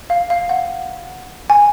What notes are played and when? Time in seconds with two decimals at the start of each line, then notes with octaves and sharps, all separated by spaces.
0.10 F5
0.30 F5
0.49 F#5
1.50 G#5